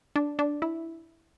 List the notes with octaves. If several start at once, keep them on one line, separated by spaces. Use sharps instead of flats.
D4
D4
E4